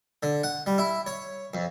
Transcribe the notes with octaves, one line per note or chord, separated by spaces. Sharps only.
D3
F#5
G3
E4
C#5
F2